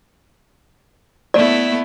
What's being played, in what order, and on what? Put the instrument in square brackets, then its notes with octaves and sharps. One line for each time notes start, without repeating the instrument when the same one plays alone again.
[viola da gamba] A3 B3 E4 [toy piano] D5